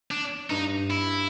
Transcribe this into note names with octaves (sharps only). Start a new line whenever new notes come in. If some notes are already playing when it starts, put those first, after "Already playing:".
D4
G2 D#4
E4